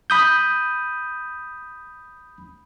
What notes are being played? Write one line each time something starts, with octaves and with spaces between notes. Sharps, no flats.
B5 D#6 G6